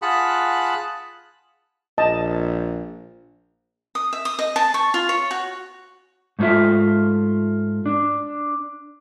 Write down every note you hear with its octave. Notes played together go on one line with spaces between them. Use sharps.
F4 G#4 F#5 A5 B5 F#6
A#1 D#5 A5
D#6
E5
D#6
D#5
A5
C#6
F4
C#5
F#4
G#2 A3 A#3 F4 E5
D4